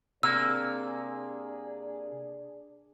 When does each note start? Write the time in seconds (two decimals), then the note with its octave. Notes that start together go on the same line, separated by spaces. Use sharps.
0.23 C3 A#3 D4 G#4 D5 E6